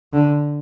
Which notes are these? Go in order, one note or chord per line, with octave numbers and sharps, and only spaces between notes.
D3